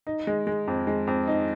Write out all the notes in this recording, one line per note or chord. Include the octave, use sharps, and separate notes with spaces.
D#4
G#3
G#3
F2
G#3
F2
D#4